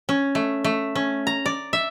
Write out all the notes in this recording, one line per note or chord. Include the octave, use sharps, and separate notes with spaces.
C#4
A3
A3
C#4
A#5
D5
E5